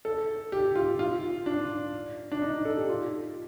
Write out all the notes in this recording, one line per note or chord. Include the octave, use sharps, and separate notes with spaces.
A4
G4
F4
F4
D4
D4
D#4
A4
G4
F4